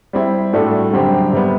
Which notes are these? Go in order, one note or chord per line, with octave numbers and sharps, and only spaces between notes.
G3 C4 E4
A2 G3 D4 F#4 A4
F#2 D3 G3 C4 G4
C3 G3 B3